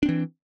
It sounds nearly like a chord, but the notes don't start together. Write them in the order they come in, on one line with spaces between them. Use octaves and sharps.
D4 C4 E3